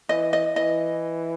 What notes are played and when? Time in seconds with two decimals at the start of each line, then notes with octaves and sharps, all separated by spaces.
0.09 E3 D#5
0.33 D#5
0.56 E3 D#5